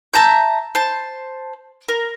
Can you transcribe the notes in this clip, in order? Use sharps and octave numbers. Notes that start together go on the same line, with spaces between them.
E5 A5 A#5 G6
C5 A5
A#4